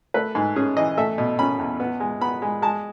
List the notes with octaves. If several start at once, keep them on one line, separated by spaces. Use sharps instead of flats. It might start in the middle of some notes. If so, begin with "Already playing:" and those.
A3 B4
G#2
C#4 G#4
E3 D#5
A3 E5
B2
C#4 B5
E2
B3
G#3
B3 B5
G#3
G#3 A5